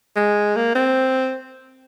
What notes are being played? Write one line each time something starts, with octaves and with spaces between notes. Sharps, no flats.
G#3
A#3
C4